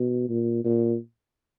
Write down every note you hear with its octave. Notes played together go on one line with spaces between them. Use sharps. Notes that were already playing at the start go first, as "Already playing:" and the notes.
Already playing: B2
A#2
A#2